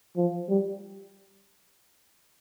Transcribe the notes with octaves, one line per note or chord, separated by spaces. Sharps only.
F3
G3